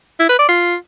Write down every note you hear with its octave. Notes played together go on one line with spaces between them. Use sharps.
E4
B4
D5
F4